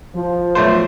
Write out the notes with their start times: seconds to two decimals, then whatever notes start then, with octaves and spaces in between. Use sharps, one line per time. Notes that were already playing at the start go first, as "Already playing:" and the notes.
0.14 F3
0.55 B1 A3 C5